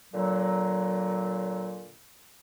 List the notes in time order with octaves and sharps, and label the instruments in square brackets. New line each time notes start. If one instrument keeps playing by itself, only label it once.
[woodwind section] A#2 D3 F#3